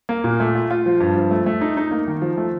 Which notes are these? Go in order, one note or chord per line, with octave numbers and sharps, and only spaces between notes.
A#3
A#2
A3
F4
F4
F3
G2
F3
A3
A3
D#4
D#4
A#3
D#3
F3
A3